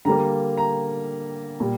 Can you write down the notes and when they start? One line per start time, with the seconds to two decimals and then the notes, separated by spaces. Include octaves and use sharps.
0.05 D3 G3 A#3 A#5
0.57 A#5
1.60 A#2 G3